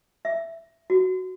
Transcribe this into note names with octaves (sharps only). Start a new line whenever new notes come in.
E5
F#4